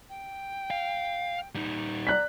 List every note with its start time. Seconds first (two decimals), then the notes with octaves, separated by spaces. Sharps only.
0.09 G5
0.71 F5
1.55 G3 D#4
2.07 D5 A#5 F#6 B6